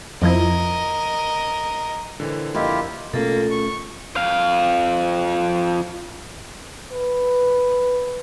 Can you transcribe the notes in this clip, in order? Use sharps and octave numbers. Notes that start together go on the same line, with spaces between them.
F2 F3 E4 A#4 D#5
A#2 D3 E3 C4
F2 A#3 E4 F4 G4 D#5
B2 A3 A#3 C#4 F4 A4
C#6
F2 F5
B4